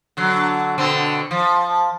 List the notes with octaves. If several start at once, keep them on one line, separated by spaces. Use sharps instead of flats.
D3 F#3
B2 D3 C4
F3